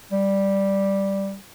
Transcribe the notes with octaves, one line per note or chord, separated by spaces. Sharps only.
G3